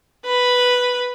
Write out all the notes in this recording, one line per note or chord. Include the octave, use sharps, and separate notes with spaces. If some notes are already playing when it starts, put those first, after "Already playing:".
B4